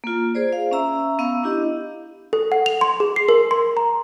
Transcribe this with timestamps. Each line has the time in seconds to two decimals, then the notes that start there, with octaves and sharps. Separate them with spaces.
0.04 A#3 F4
0.35 G#4 C5 D5
0.53 F5
0.71 C#4 E5 A#5 E6
1.19 B3 F5 E6
1.43 D4 E4 G4 D#5
2.33 A4
2.52 F#5
2.66 F7
2.81 C6
3.00 G#4
3.16 C7
3.29 A#4
3.51 C6
3.77 A#5